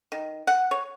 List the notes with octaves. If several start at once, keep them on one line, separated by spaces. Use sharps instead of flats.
D#3
F#5
C#5